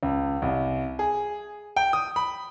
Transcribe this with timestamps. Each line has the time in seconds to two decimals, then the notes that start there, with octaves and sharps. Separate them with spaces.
0.03 C#2
0.42 C2
0.99 G#4
1.76 G5
1.93 D#6
2.16 B5